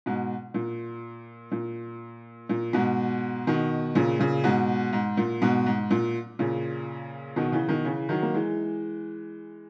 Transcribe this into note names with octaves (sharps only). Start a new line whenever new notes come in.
G#2 B2
A#2
A#2
A#2
G#2 B2
B2 D#3
A#2 C#3
A#2 C#3
G#2 B2
G#2
A#2
G#2 B2
G#2
A#2
A#2 C#3
B2 D#3
C#3 E3
B2 D#3
C#3 E3
D#3 F#3
A#3
E3 G#3